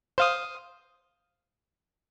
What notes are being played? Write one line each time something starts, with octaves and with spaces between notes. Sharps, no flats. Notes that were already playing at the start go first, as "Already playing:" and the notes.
C5 F5 D#6